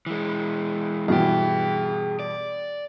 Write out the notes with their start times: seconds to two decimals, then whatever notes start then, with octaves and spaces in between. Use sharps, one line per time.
0.06 E3 G#3
1.08 G2 B2 E3 G#4 G5
2.20 D5